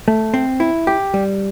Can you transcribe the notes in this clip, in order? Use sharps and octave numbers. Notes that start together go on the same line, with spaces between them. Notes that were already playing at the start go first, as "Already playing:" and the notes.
A3
C4
E4
G4
G3